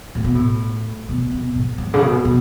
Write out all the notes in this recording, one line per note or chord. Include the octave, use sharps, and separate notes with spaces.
A2
B2
A2
B2
B2
G#2
G#2
C#3
B2
B2